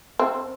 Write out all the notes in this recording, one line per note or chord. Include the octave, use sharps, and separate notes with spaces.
C4